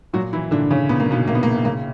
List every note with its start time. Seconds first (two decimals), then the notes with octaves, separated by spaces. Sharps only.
0.13 A#2 F#3 F#4
0.33 E3 E4
0.51 A#2 D3 D4
0.71 C#3 C#4
0.89 A#2 B3
1.00 A#3
1.11 B2 B3
1.27 A#1 A#3
1.35 B3
1.43 A#3
1.65 C#3 A#3